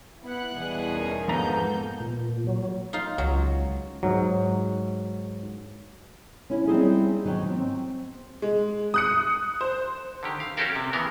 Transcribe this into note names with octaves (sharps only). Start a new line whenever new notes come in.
B3 E4 F#5 F#6
E2 B2 E3 G3 G#4
C#4 D#4 A#4
F2 G#2 A#3 B3 A4 A#5 G6
A#2
F#3
D#4 F4 F5
C#2 F#3
G#2 F#3
C#4 E4
G3 C4 D#4 E4 G#4
G#2 D#3 F#3
C4
G#3
D#6 F#6 C#7
C5
D3 D#3 G4
F5
C#4 F#4 G4 A4 A#4 F5
C3
C#3 E3 B3 A#4